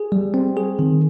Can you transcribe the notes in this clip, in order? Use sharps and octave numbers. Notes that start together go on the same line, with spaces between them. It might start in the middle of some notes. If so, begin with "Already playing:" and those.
Already playing: G#4
G3
C4
G#4
D#3